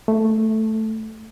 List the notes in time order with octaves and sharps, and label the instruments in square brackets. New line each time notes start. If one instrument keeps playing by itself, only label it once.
[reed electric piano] A3